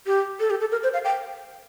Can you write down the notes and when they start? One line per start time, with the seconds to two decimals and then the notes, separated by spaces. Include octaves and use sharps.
0.07 G4
0.40 A4
0.50 G4
0.60 A4
0.72 A#4
0.83 C5
0.94 F5
1.04 G5